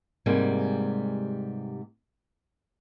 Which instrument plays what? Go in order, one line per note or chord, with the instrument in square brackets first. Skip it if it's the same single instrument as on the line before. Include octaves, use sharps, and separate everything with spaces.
[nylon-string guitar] G#2 C3 G3 G#3 A#3 B3